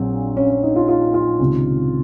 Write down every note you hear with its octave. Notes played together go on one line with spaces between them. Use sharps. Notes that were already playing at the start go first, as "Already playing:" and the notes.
Already playing: A#1 A#2 F#3 C4
C#4
C#4
D#4
F4
F4
F4
C#2 C3 D#3